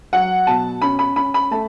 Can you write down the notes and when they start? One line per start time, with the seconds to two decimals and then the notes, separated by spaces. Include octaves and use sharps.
0.13 F#3 F#5
0.47 B2 A5
0.82 C#4 B5
0.99 B5
1.16 C#4 B5
1.34 B5
1.51 A3 A5